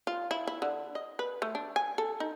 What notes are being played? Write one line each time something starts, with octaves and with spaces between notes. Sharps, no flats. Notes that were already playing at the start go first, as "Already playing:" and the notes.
F4
E4
E4
D3
D#5
B4
A3
D4
G#5
A4
D#4